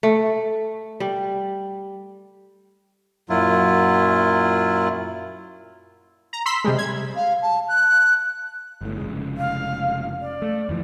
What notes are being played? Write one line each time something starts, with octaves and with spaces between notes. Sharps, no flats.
A3
G3
F#2 A#2 F#3 E4 F4
A#5
B5 C6 E6 B6
C3 G3 G#3
G#6
F5
A5
F#6
G1 A2
F1 C#3 G#3
F5
D5
A3
F2 E3 F3